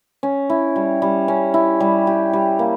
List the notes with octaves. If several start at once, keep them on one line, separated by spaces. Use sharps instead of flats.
C#4
E4
G3
G3
C#4
E4
G3
G4
G3
A#3